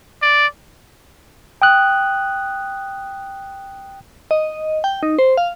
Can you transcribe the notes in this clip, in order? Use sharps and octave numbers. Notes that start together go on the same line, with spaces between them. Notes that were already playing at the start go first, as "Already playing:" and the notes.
D5
G5 D#6 F#6
D#5
G5
D#4
C5
F5